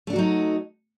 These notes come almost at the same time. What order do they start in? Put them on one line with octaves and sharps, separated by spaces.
A3 D4 F#4 F#3 D#4